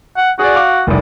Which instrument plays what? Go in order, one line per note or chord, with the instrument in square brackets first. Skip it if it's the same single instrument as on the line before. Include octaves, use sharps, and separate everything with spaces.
[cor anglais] F#5
[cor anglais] F#4 [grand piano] G#4 D5
[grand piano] F5 D6
F1 C2